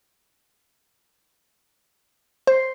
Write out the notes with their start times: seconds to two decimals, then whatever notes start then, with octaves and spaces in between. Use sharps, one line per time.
2.47 C5